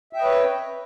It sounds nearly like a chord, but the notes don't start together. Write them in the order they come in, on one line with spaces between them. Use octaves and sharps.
E5 G5 D#5 B4 C#5